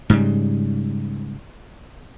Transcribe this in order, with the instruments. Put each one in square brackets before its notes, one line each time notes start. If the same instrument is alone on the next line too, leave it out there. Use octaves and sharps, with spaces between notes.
[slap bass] G#2 C#3 G3